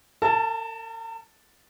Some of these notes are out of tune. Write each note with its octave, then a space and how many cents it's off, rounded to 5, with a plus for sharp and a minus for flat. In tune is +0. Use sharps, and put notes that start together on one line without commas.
A#4 -45 A5 +0